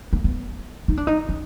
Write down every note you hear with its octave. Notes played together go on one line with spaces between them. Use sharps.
A#3
B3
D#4
D4
D#4
C#4